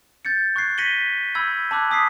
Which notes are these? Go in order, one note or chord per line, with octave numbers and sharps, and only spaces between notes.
G6 A6 C#7
C#6 F#6 G#6 C7
A#6 B6 C#7 D#7 F#7 G7
B5 E6 G6 G#6
A5 B5 D6 E6 F#6 G#6
G#5 D#6 B6 C7